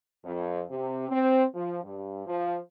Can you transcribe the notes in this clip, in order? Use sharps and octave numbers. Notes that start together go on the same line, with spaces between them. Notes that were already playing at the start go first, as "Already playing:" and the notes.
F2
C3
C4
F3
G2
F3